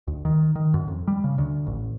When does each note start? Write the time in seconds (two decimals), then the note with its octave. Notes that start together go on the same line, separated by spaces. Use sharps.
0.07 D2
0.25 D#3
0.55 D#3
0.74 F#2
0.88 F2
1.08 G3
1.24 C#3
1.38 D2
1.67 A1